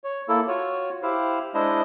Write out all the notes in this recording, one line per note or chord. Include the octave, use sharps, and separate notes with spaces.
C#5
A#3 E4 A4
F4 F#4 C#5
E4 G4 C5 F5
G#3 D4 E4 C5 D#5